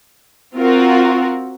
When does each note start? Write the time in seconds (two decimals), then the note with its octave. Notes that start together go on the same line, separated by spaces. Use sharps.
0.56 C4 F4 F#4 A#4